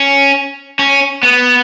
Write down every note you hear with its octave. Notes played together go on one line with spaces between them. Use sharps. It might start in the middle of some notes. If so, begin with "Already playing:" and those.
Already playing: C#4
C#4
B3